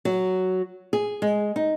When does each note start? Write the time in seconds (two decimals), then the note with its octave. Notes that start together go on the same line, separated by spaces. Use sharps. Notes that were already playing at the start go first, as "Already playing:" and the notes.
0.05 F#3
0.93 G#4
1.22 G#3
1.56 D#4